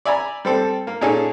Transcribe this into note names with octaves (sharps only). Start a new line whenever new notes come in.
D5 E5 G#5 A#5 B5
G3 C4 A4
A#3
A#2 C#4 D#4 G#4 A4